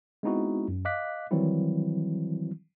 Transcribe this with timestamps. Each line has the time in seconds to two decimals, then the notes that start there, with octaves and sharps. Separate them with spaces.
0.23 G#3 B3 C4 D#4 E4 F#4
0.68 F#2
0.85 D#5 F5 D6 F#6 B6
1.31 D#3 E3 F#3 G3 C4 E4